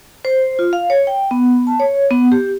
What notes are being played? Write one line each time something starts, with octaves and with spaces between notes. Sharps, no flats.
C5
F4
F5
C#5
G5
B3
A5
C#5
B3
G4